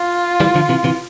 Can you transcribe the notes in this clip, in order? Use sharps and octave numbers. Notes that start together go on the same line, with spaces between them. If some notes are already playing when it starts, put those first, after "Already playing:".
Already playing: F4
E3 G3
D3 F3
C3 E3
C3 E3